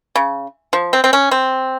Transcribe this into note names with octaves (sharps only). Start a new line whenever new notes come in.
C#3
F3
C4
C4
C#4
C4